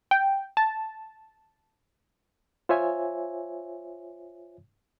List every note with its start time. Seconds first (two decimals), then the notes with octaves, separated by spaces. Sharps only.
0.11 G5
0.57 A5
2.69 F4 C5 C#5 E5 G#5